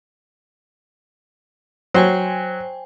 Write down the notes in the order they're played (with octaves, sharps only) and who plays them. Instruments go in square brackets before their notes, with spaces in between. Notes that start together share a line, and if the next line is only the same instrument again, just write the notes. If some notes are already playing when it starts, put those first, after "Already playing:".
[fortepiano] F#3 [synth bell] C5 G5 G#5